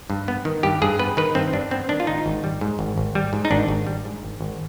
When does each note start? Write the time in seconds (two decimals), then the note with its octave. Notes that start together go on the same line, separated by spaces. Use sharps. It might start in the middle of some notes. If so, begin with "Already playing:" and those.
0.10 G2
0.28 B3
0.45 D#3
0.63 G2 G4
0.82 G2 G#4
0.99 B3 B4
1.17 D#3 B4
1.35 G2 C4
1.53 G2 D4
1.71 B3 C4
1.89 D#3 D4
2.00 F4
2.07 G#1 D#4
2.26 G#1
2.44 G3
2.61 G#2
2.79 G#1
2.98 G#1
3.15 G3
3.33 G#2
3.45 D#4
3.51 G#1 D4
3.68 G#1
3.87 G3
4.05 G#2
4.23 G#1
4.41 G#1